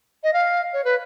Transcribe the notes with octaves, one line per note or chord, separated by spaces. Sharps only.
D#5
F5
C#5
B4